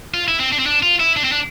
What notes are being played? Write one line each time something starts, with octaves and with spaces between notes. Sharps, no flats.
F4
E4
C4
D4
C4
D4
F4
E4
D4
C4
D4